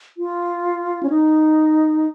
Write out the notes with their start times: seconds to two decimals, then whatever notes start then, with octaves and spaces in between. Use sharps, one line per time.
0.17 F4
1.03 C#4
1.10 D#4